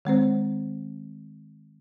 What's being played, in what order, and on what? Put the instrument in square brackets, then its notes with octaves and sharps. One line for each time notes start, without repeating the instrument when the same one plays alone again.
[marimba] D#3 G#3 C4 C5